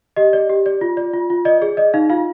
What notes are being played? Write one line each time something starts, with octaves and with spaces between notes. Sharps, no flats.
G4 D#5
D5
G4
D5
F4
D5
F4
F4
D5 D#5
G#4 D5
D5 D#5
D#4 F5
F4 F5